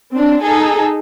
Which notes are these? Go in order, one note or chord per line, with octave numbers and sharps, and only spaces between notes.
C4 D4
D#4 G#4 A4